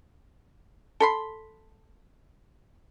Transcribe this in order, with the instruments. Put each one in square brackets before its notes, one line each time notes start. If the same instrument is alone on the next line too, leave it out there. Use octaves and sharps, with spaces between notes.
[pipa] A4 B5 C6